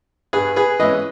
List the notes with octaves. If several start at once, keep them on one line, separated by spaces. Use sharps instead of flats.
G2 G#4 B4
G#4 B4
E3 G#3 C#4 E4 B4 D#5